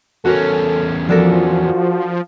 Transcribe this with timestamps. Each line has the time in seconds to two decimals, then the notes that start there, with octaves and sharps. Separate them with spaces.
0.25 E2 C#4 F#4 A4 A#4 C#5
1.09 F3 D4 F#4 A4 A#4